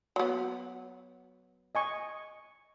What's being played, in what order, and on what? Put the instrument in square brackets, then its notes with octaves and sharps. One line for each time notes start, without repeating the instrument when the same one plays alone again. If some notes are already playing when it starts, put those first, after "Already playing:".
[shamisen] F#3 B3
[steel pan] D#5 G#5 C#6